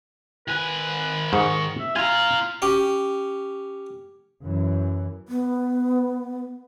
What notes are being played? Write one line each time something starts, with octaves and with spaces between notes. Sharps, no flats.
D#3 B4 G#5
G#2 C#6
E5
F4 F5 G#5 A#5
C#4 G4
F#2 E3
B3